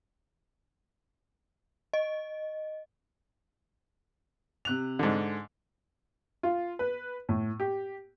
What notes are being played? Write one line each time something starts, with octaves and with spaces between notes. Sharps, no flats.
D#5
C3 F#6 F7
G#2 D3
F4
B4
A2
G4